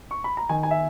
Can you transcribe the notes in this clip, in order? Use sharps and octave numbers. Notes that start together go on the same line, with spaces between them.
C#6
B5
A#5
D#3 G#5
G#5
E5